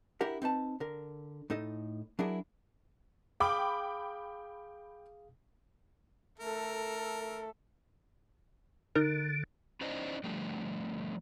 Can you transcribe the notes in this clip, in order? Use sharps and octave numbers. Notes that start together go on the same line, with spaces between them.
D4 E4 G4 A#4 F#5
C4 D#4 B4 A5
D3 A#4
A2 D#4 A4 D#5
F#3 D4 E4 G#4 A#4
G#4 F5 G5 B5 D6 D#6
A3 A4 A#4
D3 D#4 A#4
C#4 D#4 E4 C5 D5 D#5
D3 F3 G3 A3